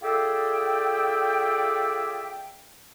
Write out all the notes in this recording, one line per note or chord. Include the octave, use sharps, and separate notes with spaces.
F4 G#4 A4 D5 E5 G5